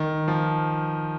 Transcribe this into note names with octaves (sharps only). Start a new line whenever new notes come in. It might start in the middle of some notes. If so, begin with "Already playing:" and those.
Already playing: D#3
F3